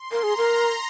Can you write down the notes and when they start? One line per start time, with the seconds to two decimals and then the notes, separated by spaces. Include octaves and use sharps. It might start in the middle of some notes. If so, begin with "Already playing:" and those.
Already playing: C6
0.12 A#4
0.23 G#4 A#5
0.37 A#4